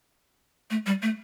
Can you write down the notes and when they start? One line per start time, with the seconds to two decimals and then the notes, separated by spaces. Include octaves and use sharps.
0.70 A3
0.86 G3
1.02 A3